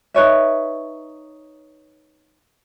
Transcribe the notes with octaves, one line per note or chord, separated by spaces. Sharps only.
D#4 B4 C#5 E5